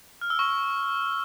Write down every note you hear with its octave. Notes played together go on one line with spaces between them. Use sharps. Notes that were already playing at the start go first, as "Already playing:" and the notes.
F6
E6
C#6